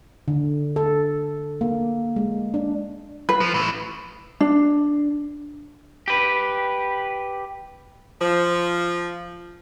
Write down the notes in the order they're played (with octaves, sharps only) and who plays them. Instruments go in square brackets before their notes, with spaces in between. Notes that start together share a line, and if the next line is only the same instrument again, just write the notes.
[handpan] D3
A4
A#3
G#3
D4
[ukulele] B4
[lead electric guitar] F3
A2 E3
[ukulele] D4
[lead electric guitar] G4 B4
[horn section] F3